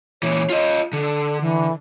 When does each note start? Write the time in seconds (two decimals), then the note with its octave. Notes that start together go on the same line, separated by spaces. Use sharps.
0.23 A#2 E3 C#5
0.50 F4 D#5
0.93 D3 A4
1.41 E3